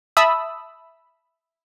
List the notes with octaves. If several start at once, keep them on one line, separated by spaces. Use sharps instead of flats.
E5 A5 B5 D#6 E6